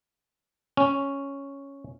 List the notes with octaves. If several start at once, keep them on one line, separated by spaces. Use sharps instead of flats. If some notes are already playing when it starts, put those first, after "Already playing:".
C#4